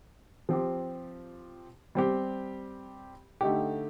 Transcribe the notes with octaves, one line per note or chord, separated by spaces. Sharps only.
F3 C4 G4
G3 C4 G4
D3 A3 D#4 G4